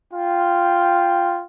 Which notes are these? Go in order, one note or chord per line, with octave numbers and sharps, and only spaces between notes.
F4 G5